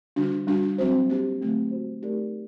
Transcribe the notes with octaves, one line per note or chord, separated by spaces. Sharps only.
D3 G3 D4 F#4
G3 D4 F#4
F#3 C4 F#4 C5
A#3 D4 G4 C5
D3 F#3 A3 C4
A#3 F#4 C5
A3 D#4 G4 A#4 D5